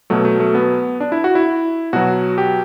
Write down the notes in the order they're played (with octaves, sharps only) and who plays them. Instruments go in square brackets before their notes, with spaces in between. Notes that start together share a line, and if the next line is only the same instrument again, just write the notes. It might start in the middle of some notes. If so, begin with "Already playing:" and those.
[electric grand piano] B2 F#3 A3
A3
A3
B3
D4
E4
F#4
E4
B2 F#3 F#4
G4